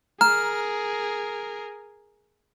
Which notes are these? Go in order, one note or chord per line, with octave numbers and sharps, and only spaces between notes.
G#4 A#4 A#5 F6